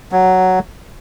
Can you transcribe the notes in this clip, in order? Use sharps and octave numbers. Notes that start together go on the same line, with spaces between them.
F#3